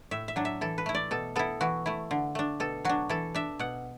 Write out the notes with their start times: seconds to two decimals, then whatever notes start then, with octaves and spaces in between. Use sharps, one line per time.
0.11 A2 E5
0.28 E5
0.36 F#3 D4
0.45 E5
0.61 E3 A4
0.78 B4
0.86 A3 E4
0.95 D5
1.11 B2 A4
1.36 B3 E4 A4
1.61 E3 F#4
1.86 A3 E4
2.11 D3
2.35 A3 D4
2.60 B2 A4
2.85 F#3 D4 F#4
3.09 E3 A4
3.35 D4 E5
3.59 B2 F#5